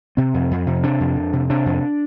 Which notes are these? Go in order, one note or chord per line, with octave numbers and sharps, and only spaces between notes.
C3 C4
F2
F2
C3
C3 D4
F2
F2
C3
C3 D4
F2